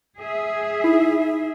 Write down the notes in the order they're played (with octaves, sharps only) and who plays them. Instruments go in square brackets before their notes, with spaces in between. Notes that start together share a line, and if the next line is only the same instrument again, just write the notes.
[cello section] G#4 E5
[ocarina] D#4 [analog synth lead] E4